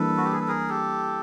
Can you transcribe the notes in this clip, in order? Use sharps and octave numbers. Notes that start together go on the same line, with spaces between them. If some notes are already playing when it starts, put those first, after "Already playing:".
Already playing: E3 G3 A#3 D4 A4 B4
F#4
G4
G#4
A4
G#4 A#4
G4 A4